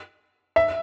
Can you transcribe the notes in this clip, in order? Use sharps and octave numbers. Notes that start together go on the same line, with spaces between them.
E5